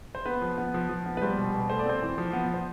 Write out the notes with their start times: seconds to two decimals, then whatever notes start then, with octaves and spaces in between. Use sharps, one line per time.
0.15 C5
0.26 B3 B4
0.42 F3
0.58 B3
0.74 F3
0.89 F3
1.06 B3
1.17 B4
1.22 G3 C5
1.38 B2
1.54 B2
1.70 A3 C5
1.79 D5
1.86 C4 C5
2.02 E3
2.18 F3
2.33 B3
2.50 B3 C5